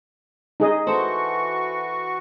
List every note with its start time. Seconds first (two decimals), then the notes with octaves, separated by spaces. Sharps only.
0.60 D#4 G#4 D#5
0.87 E3 F#4 A4 C5 C#6